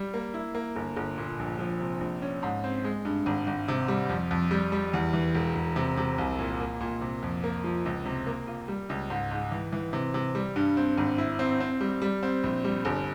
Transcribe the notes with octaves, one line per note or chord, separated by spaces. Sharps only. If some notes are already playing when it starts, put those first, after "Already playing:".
Already playing: G3
A#3
E4
A#3
G1
G1
A#2
A#1
F3
C3
A#1
C#4
G#2
C4
G#3
G2
G#1
G#1
C3
G3
F2
F2
G3
G3
E2
E3
E1
E1
C3
C3
C2
A#2
A#3
A#2
C3
F2
A#3
F3
C#2
C3
A#3
F4
G3
C#2
G#2
G#2
E3
E3
C3
C3
G3
G2
C4
G#1
E4
C4
C4
G3
G3
C4
A#1
G3
G1